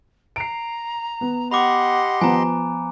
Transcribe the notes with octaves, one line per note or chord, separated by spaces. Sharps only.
A#5 C7 D7
B3
G4 D#5 F#5 B5 C6 D6
F3 B3 G#5 A#5